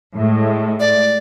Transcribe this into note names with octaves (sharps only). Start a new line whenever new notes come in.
A2 G#3
D5